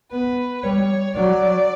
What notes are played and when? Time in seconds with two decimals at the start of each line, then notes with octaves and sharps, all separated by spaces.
0.11 B3 B4
0.63 G3 C#5
1.15 F#3 D5